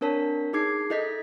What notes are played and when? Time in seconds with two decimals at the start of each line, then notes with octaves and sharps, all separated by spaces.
0.01 C4 D4 A#4 C#5 A5 B6
0.53 D#4 G#4 D6 G#6 C7
0.90 E4 A4 D#5 G6 B6